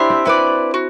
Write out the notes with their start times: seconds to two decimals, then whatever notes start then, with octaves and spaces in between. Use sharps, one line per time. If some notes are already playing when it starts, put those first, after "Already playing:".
Already playing: D4 E4 G4 C5 E5
0.10 C4
0.26 E4 F#4 B4 D5
0.74 F#4